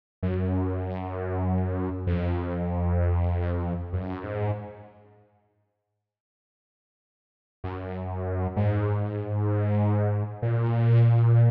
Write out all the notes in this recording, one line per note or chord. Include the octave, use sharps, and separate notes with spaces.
F#2
F2
F#2
G#2
F#2
G#2
A#2